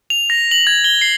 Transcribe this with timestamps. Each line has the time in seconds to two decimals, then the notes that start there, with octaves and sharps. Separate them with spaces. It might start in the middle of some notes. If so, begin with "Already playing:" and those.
0.10 F7
0.30 A#6
0.51 F#7
0.67 G#6
0.84 G7
1.01 C7